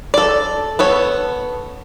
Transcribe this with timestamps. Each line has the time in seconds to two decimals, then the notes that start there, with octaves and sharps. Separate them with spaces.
0.14 A4 D5
0.79 B3 A4 C#5